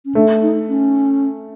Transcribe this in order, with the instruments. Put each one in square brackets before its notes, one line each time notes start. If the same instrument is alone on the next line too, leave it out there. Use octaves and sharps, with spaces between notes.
[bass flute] C#4
[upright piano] A3 [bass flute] D4
[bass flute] D#4
C#4